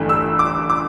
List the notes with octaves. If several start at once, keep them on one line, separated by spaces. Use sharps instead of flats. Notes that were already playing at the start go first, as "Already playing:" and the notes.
Already playing: G1 G2 E3 A3
E6
D6
D6